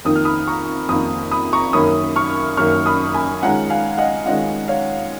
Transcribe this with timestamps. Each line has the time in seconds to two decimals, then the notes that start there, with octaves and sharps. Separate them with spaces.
0.05 F2 D#3 A#3 D#4 D#6
0.16 F6
0.25 B5 D#6
0.47 A#5 C#6
0.89 F2 D#3 A#3 D#4 B5 D#6
1.31 B5 D#6
1.53 A#5 C#6
1.73 F#2 D#3 A#3 C#4 B5 D#6
2.16 C#6 F6
2.57 F#2 D#3 A#3 C#4 C#6 F6
2.86 B5 D#6
3.14 G#5 B5
3.42 D#3 G#3 C#4 F4 F#5 A#5
3.70 F5 G#5
3.98 D#5 F#5
4.26 D#3 G#3 C#4 F4 D#5 F#5
4.68 C#5 F5